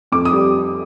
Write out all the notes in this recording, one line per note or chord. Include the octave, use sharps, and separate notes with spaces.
F2 D6
D#6
G3